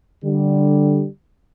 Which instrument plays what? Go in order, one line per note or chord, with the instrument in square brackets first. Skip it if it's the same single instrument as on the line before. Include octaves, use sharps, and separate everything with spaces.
[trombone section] D3 G3